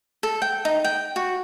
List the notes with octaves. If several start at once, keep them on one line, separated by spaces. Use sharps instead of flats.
A4
G5
D#4
G5
F#4